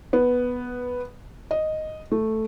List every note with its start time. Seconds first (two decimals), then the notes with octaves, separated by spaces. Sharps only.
0.13 B3
1.51 D#5
2.12 A3